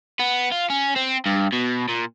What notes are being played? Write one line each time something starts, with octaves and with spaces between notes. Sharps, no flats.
B3
F4
C#4
C4
G2
B2
A#2